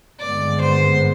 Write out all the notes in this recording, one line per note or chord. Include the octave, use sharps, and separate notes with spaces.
G#1 G2 D3 G#3 B3 D5
C5